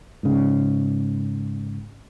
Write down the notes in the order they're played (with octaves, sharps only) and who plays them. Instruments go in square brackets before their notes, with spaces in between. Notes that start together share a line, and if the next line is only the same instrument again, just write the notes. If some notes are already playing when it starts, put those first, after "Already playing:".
[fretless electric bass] G#2 C#3